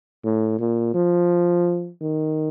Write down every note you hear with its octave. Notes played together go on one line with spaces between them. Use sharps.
A2
A#2
F3
D#3